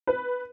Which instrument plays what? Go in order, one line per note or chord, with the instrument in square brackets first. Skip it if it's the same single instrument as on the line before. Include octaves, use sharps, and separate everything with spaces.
[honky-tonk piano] B4